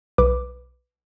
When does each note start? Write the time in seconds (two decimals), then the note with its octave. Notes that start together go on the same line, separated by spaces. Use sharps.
0.18 B1 B4 D6